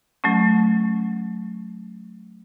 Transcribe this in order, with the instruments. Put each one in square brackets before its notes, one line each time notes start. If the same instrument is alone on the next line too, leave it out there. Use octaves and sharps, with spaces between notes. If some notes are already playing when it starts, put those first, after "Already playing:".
[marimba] F#3 A3 C#4